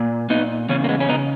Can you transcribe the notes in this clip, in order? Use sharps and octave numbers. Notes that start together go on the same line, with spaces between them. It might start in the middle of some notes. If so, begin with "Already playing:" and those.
Already playing: A#2
A#2 B3 D#4
E2 C#3 C#4
A#3
G#3 B3
C#4
C#3 B3 D#4